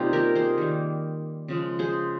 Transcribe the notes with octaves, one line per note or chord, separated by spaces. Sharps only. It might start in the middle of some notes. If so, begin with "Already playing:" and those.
Already playing: C3 G3 A#3 D#4 F4
G4 A#4
G#4 C5
D#3 G3 A#3
C#3 F3 G#3
G#4 C5